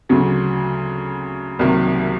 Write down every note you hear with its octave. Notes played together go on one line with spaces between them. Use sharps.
D2 C#3 F#3
C2 C3 D#3 F#3 A#3